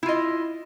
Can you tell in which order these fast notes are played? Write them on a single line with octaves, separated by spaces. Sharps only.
E4 F4 D#5